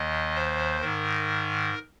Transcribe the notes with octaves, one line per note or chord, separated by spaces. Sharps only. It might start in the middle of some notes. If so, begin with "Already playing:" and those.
Already playing: D#2 D#3 D#5
C5
G#2 D#3 A#4